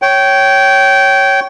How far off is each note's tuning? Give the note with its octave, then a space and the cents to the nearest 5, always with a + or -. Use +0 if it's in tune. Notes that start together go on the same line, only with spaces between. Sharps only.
C#5 +0 G5 -20